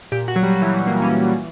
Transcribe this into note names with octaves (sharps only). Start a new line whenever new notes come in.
A#2 G4
F#4
F#3
G3
F#3
E3
F#3
A#3
C#4
E3